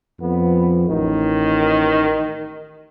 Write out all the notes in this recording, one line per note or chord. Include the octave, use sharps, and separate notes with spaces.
F2 B3
A1 D#3